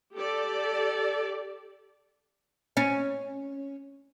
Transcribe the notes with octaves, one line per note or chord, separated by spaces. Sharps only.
G4 A4 D5
C#4